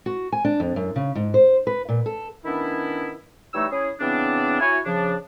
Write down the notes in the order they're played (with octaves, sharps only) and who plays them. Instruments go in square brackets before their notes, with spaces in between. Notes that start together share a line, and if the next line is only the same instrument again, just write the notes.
[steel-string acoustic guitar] F#4
G#5
D4
F2
F#2
C#3
G#2
C5
B4
A#2
A4
[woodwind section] D#3 B3 C#4 D4 E4
E3 G3 A3 D#4 C#5 E6
C#4 E4 G#4
C#3 E3 B3 C4 D4
E4 F#4 C#5 G#5
C#3 F3 D4